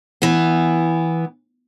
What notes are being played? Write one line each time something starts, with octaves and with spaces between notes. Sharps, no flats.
E3 B3